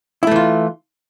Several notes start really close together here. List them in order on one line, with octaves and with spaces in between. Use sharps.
E4 A3 E3 F4